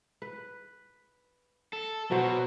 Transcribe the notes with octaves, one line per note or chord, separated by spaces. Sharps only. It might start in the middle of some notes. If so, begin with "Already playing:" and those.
B4
A4
B2 F#3 F#4 C5